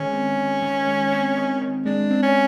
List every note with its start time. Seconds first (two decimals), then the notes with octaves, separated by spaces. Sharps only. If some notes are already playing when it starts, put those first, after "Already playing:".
Already playing: D#3 G#3 C#4
0.13 C4
0.37 D#3
0.62 D#3
0.87 G#3
1.12 C4
1.37 D#3
1.61 D#3
1.86 G#3 D4
2.11 C4
2.23 C#4